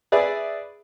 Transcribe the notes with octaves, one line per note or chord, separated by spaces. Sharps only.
G#4 B4 D5 E5